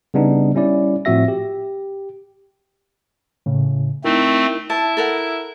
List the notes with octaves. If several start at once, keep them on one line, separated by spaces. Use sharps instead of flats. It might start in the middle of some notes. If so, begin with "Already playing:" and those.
C#3 G3 B3 D4 D#4
G3 C#4 E4 D5
A2 F3 C4 F#4 E5 A#6
G4
A2 C#3
A3 C4 D#4 E4 A#4
E4 A5
A4 A#4 F#5